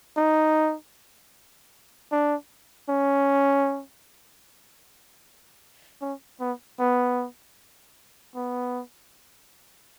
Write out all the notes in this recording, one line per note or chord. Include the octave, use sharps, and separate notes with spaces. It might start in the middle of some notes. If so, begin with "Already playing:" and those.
D#4
D4
C#4
C#4
B3
B3
B3